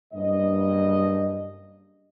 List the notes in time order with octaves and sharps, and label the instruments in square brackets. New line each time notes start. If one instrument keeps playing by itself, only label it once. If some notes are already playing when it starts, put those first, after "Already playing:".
[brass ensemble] F#1 G2 D#5